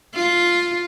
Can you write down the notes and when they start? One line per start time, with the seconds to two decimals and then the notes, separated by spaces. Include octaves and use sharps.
0.15 F4